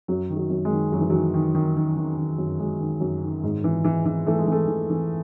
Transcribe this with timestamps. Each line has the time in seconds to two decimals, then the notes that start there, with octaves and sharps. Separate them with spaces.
0.08 F#2 F#3
0.30 D#3
0.36 F#3
0.50 F#2
0.65 G#3
0.72 D#3
0.92 F#2 F#3
1.01 E3
1.10 D#3 F#3
1.34 D#3
1.55 D#3
1.77 D#3
1.97 D#3
2.17 D#3
2.38 F#2
2.60 F#2 G#3
2.80 D#3
3.01 F#2
3.22 D#3
3.43 G#2
3.64 E3
3.84 E3
4.06 E3
4.26 E3 A3
4.39 G#3
4.48 E3 A3
4.68 E3
4.90 E3